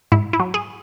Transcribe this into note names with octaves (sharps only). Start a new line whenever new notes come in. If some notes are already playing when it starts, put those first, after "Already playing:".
G#2 E4
E4
F#3
G#4